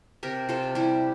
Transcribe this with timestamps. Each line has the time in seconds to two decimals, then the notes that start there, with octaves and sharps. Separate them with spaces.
0.23 C3 G4 A#4
0.49 C3 F4 A4
0.75 G3 E4 G4